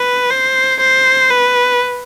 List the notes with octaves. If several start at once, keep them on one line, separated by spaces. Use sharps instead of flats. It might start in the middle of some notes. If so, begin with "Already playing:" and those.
Already playing: B4
C5
C5
B4